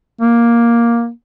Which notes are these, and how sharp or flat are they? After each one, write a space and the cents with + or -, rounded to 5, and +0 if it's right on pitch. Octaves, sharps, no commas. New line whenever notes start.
A#3 +5